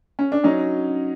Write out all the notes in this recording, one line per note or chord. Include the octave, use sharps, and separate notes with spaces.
C#4
D4
F#3 C#4 D#4